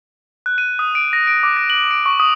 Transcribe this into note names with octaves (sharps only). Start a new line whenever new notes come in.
F#6
D#7
D#6
D7
A#6
D7
D6
A#6
F#7
D7
C#6
D#6